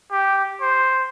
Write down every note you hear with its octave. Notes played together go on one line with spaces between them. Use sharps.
G4
C5